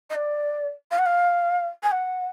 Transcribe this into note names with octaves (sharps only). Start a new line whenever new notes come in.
D#5
D5
F5
F#5
F5
G#5
F#5